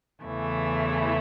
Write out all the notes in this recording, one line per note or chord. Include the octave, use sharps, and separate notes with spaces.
E2 C#3 E3 A3 E4